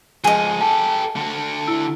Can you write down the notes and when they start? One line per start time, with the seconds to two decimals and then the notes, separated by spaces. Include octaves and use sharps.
0.24 F3 G#3 G#4 D#5
0.61 G4 A4 A5
1.16 D3 F#4
1.67 E4 E6